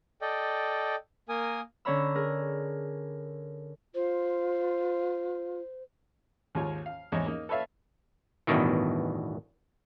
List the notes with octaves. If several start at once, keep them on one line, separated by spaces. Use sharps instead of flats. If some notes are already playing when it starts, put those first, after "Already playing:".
A4 D5 D#5 G5
A#3 A#4 G#5 D#6
D3 C#4 C#5 A#5 B5 E6
G#4 A#4
F4 C5
D#2 G#2 F4 C#5
F5
E2 G#2 C#5 D#5
A#3 D#4
A4 B4 C#5 E5 F5 A5
A1 E2 G2 B2 D#3 E3